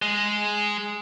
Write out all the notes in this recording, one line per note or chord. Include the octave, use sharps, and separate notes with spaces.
G#3